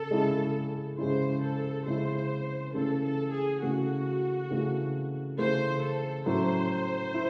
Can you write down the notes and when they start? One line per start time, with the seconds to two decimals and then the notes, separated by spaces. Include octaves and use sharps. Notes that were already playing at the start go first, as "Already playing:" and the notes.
Already playing: C#3 A4
0.10 C#3 G#3 C#4 E4
0.98 C#3 G#3 C#4 E4 C5
1.42 A4
1.86 C#3 G#3 C#4 E4 C5
2.74 C#3 E3 A3 C#4 A4
3.04 A4
3.32 G#4
3.62 C#3 E3 A3 C#4 F#4
4.50 C#3 E3 A3 C#4
5.38 C#3 E3 A3 C#4 C5
5.82 A4
6.26 A2 F#3 A3 C#4 E4 C5
7.14 E4